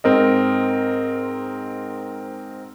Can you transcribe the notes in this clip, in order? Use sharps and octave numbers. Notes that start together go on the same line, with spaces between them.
G#2 C4 A#4 D#5